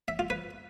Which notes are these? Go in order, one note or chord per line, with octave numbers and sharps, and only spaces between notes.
E5
F4
B4